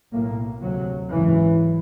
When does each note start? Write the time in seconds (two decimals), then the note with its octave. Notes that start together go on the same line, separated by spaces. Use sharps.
0.12 B1 A2 A#3
0.61 D2 C3 F#3
1.10 G#1 F#2 C#3 E3